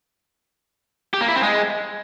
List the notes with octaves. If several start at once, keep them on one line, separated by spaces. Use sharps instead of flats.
G4
A#3
E4
C4
G#3